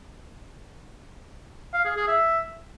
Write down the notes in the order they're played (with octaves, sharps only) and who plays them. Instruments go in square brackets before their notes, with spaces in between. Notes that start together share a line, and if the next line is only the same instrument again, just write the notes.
[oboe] F5
G#4
G#4
E5